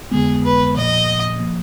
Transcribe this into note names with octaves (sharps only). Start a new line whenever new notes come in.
F2 D3 G#3 B3 G#4
B4
A#2 F3 A#3 D#5
F3 A#3